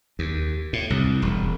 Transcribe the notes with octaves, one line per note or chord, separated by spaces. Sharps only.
D#2
A2
C2
E1